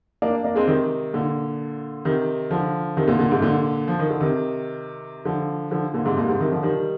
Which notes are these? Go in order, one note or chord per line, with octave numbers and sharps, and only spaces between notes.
A#3 D4
A#3 D4
G#3 C4
C3 D#3
A#2 D3
C3 D#3
D3 F3
C3 D#3
A#2 D3
A#2 D3
G#2 C3
A#2 D3
F3
D#3
D3
C3 D#3
D3 F3
D3 F3
A#2 D3
G#2 C3
G2 A#2
G#2 C3
C3 D#3
D3 F3
D#3 G3